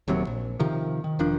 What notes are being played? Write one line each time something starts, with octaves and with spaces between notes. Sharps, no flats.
D#1 D#2 C3 F#3
A#1
C3 D#3 F3
D#3
E1 D#3 F3 D4